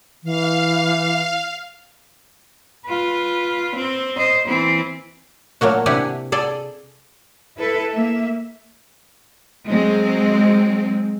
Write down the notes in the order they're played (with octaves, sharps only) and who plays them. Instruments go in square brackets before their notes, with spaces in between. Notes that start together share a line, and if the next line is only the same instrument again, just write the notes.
[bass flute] E3 [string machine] F5
[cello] F4 B4
C4
C5 D#5
E3 C4
[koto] A#2 F#3 A3 A#3 F#4
C3 D4 E4 G4 F#5 G#5
G#4 A4 D5
[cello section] E4 A4 B4
A#3 E5
F#3 G#3 C4